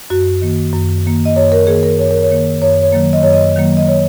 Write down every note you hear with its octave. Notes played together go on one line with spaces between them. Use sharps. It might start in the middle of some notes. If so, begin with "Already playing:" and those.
F#2 F#4
D#3 A#3
F#2
D#3 A#3
D#5
F#2 C#5
A#4
D#3 A#3 G#4
A#4
F#2 C#5
A#4
C#5
D#3 A#3
F#2 C#5
C#5
D#3 F#3 A#3
D#5
F#2 C#5
D#5
D#3 F#3 A#3
D#5
C#5